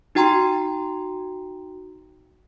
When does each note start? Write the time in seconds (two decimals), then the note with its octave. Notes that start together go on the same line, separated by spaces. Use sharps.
0.15 D#4 F#4 G5 A#5 C6